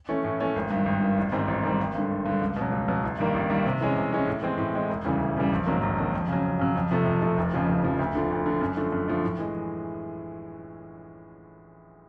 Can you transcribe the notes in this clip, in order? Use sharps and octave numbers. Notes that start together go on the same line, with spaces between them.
E3 A3 C#4
A2
E3 A3 C#4
G#1
G2 D#3
G#1
G2 D#3
A1
G#2 D#3 G3 C4
A1
G#2 D#3 G3 C4
G#1
G2 D3
G#1
G2 D3
C#2
B2 F#3
C#2
B2 F#3
A1
G2 D#3 G3 A#3
A1
G2 D#3 G3 A#3
C3
E3 G#3 C#4
C3
E3 G#3 C#4
A2
E3 G#3 C4
A2
E3 G#3 C4
E1
D2 C#3 E3 G3
E1
D2 C#3 E3 G3
A#1
G#2 D#3 F#3 A#3
A#1
G#2 D#3 F#3 A#3
F2
C#3 F#3
F2
C#3 F#3
F2
C3 F3 A3
F2
C3 F3 A3
F1
F2 C#3 F3
F1
F2 C#3 F3
D2
D3 F3
D2
D3 F3
F#2
D3 F3 A3
F#2
D3 F3 A3
A2
E3 G#3